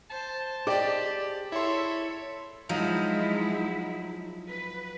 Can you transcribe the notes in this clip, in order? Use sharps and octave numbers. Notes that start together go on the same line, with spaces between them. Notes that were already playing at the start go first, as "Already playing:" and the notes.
C5 A5
G4 G#4 C5 D5 D#5 G5 D6
E4 A4 C#5 E5 C6
F3 F#3 G#3 D#4 E4
B4